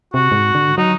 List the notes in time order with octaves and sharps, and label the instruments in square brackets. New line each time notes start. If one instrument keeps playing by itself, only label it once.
[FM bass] C3 [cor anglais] F#4
[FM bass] G#2
D3
[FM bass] F#3 [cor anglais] D#4